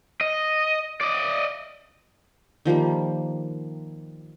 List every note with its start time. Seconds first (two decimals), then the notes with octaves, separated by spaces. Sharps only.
0.21 D#5
1.01 D5 D#5
2.65 D#3 F3 G3 A#3